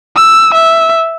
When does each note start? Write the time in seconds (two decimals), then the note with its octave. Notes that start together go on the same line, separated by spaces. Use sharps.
0.16 E6
0.54 E5